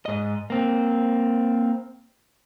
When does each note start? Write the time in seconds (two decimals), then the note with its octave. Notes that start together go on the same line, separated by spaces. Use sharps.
0.06 G#2 D#5
0.50 A#3 C4